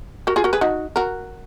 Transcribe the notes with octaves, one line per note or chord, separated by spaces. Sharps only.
F#4 A#4
F4 G#4
F#4 A#4
G#4 B4
D#4 F#4
F#4 A#4